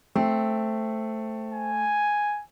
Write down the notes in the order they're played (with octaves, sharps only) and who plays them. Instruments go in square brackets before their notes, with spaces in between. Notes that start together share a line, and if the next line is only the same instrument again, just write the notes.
[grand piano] A3 [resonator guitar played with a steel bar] C4
[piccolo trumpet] G#5